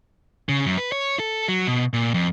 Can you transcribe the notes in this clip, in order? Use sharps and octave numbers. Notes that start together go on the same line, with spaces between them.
C#3
F#2
B4
C#5
A4
F#3
B2
A#2
F2